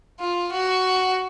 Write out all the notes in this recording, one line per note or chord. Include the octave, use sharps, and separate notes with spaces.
F4
F#4